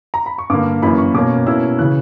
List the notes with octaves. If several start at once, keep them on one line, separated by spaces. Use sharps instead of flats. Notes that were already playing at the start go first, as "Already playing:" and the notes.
A#5
B5
C#6
G2 D3 A#3 D6
F#2 E3 A#3 B5
C#6
B2 A#3 C#4 D6
B2 A#3 C#4 E4 E6
C#3 E3 F#6